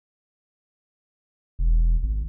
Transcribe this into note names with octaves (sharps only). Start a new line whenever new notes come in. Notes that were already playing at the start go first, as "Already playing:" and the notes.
E1
G#1